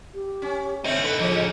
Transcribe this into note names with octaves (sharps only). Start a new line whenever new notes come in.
G4
C#4
D3 C4 C#4 D#4 E5
A4 B4
C#3 F3